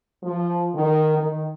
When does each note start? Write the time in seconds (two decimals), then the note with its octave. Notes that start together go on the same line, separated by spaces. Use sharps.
0.24 F3
0.74 D#3
1.18 D#3